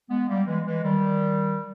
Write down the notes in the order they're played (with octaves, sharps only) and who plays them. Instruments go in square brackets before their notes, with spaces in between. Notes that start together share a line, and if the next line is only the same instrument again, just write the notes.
[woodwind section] G#3 B3
G3 A#3
E3 G#3
E3 G#3
D#3 G3